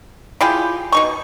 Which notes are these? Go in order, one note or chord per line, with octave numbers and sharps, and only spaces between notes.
E4 F4 G4 G#4
B2 D#4 C#6